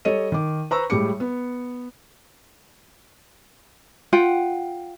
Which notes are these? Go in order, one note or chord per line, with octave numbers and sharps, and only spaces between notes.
G3 A4 C#5 D#5 D#7
D#3 D6
B4 C5 A#5 C#6 E6
A2 G3 G#3 D6 C#7
B3
F4 F#5 G5